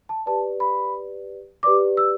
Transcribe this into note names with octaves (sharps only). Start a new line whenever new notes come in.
A5
G4 B4 D5 A5
B5
G4 B4 D5 D6
E6